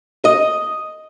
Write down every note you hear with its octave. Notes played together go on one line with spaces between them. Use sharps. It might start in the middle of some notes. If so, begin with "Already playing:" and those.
D#5